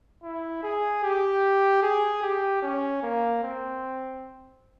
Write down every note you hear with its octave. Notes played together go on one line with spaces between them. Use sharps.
E4
G#4
G4
G#4
G4
C#4
A#3
C4